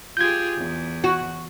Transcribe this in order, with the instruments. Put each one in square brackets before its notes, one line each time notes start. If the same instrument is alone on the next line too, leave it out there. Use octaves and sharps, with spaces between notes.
[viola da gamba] F4 G4 G#4 [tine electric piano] G6 G#6
[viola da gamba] E2
[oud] F#4